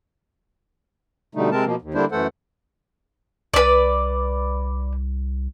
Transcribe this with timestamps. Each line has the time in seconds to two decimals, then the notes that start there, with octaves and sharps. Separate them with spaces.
1.35 B2 D3 G3 A3 D#4
1.51 C3 G#3 C4 A#4 A5
1.65 B2 F3 A#3
1.82 D#2
1.94 D3 G3 A#3 D4 E4 C5
2.12 F#2 E3 A3 A4 C5 F#5
3.54 C2 B4 D5